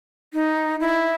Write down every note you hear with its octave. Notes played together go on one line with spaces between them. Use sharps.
D#4
E4